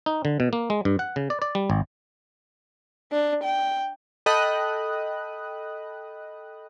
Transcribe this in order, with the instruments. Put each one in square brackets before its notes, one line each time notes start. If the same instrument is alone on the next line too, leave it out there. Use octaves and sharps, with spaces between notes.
[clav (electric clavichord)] D#4
D3
B2
A#3
G#3
G2
F#5
C#3
D5
D5
G3
G#1
[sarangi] D4
G5
[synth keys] A4 D#5 G5 B5 D#6 F#6